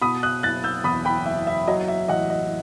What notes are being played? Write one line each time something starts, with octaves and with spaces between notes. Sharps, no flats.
B2 B5 D#6
D#6 F#6
F#1 F#6 A6
E6 G6
E2 B5 D#6
G5 B5
F#1 E5
E5
F#3 D#5
E5
A1 D#5 F#5
D#5